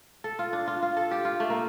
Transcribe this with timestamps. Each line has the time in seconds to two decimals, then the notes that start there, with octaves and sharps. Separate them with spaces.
0.24 A4
0.39 F4
0.53 D4
0.67 F4
0.82 F4
0.97 A4
1.11 G4
1.25 F4
1.40 A3
1.50 A#3